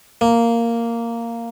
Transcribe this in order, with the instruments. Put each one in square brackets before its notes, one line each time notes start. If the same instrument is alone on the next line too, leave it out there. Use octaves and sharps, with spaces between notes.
[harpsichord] A#3